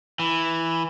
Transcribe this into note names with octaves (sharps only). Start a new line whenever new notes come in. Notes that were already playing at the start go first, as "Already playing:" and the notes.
E3